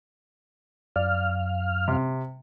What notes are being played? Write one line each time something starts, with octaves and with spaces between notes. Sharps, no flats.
F#2 D5 F5 F6
C3